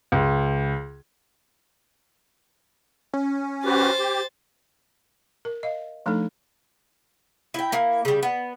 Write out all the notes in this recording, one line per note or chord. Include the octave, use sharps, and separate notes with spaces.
C#2
C#4
F#4 G4 B4 C5 A6
G4
A#4
D#5 F5
F3 A3 D4 D#4 A4
E4 G5
A#3 E4
C#3 G3
B3